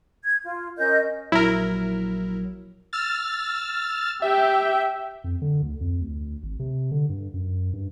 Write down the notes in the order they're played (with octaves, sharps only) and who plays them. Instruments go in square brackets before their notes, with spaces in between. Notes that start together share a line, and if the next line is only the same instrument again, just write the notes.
[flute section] G#6
F4
C#4 A#4 D#5 G6
[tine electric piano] A#1 F#3 [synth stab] E4 A#4
[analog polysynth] E6 F6 A6
[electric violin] G4 G5 [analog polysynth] E5
[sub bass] F2
D3
D2
F2
D2
G#1
C3
D3
G2
F#2
G2